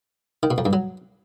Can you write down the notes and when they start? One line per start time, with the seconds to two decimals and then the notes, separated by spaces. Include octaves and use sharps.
0.43 D#3
0.51 B2
0.58 F2
0.65 G2
0.73 F#3